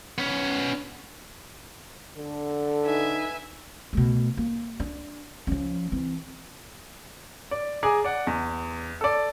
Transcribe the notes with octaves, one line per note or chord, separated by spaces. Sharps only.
B3 C#4
D3 A4
D#4 B4 E5 G#5
B2 A3
A#3
D4
F3 C#4
E3 C4
D5
G#4 G#5 A#5 D6
D5 F#5
E2
A4 D5